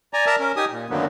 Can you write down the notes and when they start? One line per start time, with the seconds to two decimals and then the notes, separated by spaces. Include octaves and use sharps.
0.13 D5 G#5 A#5
0.26 A#4 D5 E5 A5 A#5
0.39 C#4 A#4
0.56 D#4 G4 G#5 D#6
0.70 A#2
0.90 F#2 D3 D#3 F#3 A#3 B3